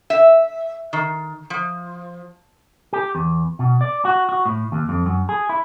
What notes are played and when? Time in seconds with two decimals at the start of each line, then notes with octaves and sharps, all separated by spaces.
0.10 E5
0.93 D#3
1.50 F3
2.93 G4
3.15 E2
3.59 B2
3.81 D5
4.05 F#4
4.29 F#4
4.46 A2
4.72 D#2
4.89 F2
5.06 F#2
5.29 G#4
5.49 E4